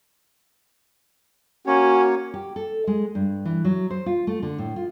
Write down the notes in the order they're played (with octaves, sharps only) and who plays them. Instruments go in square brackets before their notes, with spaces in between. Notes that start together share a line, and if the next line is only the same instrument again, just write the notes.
[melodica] A#3 C#5 [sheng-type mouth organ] C#4 [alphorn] F#4
[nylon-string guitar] G4
A4
G#3
G2
E3
F#3
C5
F4
A3
D3
A2
F4